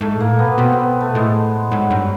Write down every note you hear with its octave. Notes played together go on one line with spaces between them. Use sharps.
G#2 A3
A2
A#3
A#2
B2 B3
B2 C4
B3
A3
A2 G#3
G#2 F#3
G2 F#3